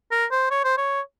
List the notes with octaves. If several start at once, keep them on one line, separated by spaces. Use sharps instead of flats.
A#4
C5
C#5
C5
C#5